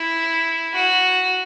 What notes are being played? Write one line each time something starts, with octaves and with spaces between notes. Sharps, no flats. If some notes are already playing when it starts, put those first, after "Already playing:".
Already playing: E4
F#4